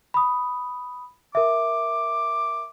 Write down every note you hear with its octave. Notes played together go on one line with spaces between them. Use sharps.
B5 D#6
A#4 E5 D6